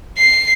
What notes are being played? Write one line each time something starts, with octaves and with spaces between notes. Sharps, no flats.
C7